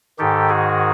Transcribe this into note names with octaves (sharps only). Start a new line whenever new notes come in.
G#2 D#3 G4 A4
F#4 G#4